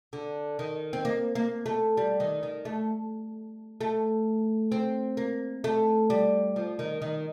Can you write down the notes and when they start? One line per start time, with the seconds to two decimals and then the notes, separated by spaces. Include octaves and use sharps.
0.13 D3
0.59 D#3
0.93 C4
1.05 A#3
1.35 A#3
1.66 A3
1.97 G3
2.20 D#3
2.43 D#3
2.65 A3
3.81 A3
4.72 C4
5.17 A#3
5.64 A3
6.10 G3
6.56 F3
6.79 D#3
7.02 D#3